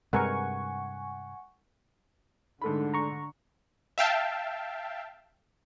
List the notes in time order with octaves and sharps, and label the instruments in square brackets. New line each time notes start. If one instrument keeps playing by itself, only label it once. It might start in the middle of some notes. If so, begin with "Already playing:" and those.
[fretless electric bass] G2 C3 [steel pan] G#3 A#4 B4 [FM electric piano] F#5 G#5 C#6
[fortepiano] G#2 A3 B5 [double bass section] D3
[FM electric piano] A#5 C#6
[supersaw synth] E5 F5 G5 A5